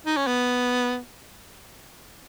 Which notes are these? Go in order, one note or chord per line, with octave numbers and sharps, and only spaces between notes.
D#4
C#4
B3